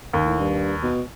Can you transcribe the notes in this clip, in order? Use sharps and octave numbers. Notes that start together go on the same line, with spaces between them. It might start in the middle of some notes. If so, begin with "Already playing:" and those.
D#2
A2
G2
B2